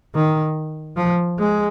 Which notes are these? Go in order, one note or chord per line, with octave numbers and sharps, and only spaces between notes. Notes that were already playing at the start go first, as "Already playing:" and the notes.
D#3
F3
G#3